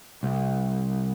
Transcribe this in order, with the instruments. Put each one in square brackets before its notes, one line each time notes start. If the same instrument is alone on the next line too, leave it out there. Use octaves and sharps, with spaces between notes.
[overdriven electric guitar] C2